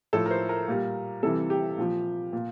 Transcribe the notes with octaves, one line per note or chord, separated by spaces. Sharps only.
A2 F3 A4
A#4
C5
A#4
A#2 G3
C3 E3 G3 A4
G4
A#2 F3
A#2